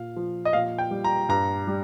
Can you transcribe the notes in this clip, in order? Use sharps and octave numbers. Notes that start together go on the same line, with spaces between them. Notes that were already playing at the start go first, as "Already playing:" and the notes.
Already playing: A#2 F5
F3
D#5
A#2 F5
G5
G3
A#5
G2 A#5
G3